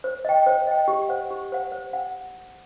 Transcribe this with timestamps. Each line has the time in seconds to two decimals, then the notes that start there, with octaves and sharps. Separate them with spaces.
0.04 C5
0.25 D#5 G5
0.46 C5
0.67 D#5 G5
0.88 G4
1.09 C5 F#5
1.30 G4
1.52 C5 F#5
1.72 C5
1.93 F#5